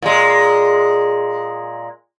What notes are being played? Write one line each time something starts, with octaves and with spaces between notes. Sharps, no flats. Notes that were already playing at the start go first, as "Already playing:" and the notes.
A#2 G#3